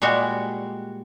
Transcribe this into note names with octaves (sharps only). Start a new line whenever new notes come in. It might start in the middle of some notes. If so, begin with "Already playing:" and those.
A#2 G3 G#3 F#4